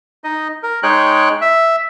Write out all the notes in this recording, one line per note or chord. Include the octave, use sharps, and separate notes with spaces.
D#4 D#5
A#4
G#3 D#4 G#4 C#5 G5 F#6
E5